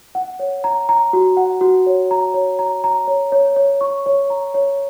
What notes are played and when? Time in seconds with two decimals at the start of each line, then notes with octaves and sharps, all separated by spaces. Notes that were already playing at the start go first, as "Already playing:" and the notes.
0.15 F#5
0.40 C#5
0.64 A#5
0.89 A#5
1.13 F#4
1.37 F#5
1.61 F#4
1.87 C#5
2.11 A#5
2.34 C#5
2.59 A#5
2.84 A#5
3.07 C#5
3.32 C#5
3.56 C#5
3.81 C#6
4.06 C#5
4.30 A#5
4.54 C#5